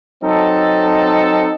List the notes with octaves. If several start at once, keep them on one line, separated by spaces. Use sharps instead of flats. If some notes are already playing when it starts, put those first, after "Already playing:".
F#3 C4 D#4 A4